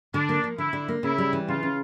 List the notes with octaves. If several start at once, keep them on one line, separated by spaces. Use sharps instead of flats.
D3 D4
A#3
F3
D3 E4
D3
A#3
C#3 E4
G3
E3
C#3 F4
C#3